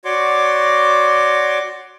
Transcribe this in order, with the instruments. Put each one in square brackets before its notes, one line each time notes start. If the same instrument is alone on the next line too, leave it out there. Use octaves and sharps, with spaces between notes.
[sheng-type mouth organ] F#4 C#5 D5 C6 D6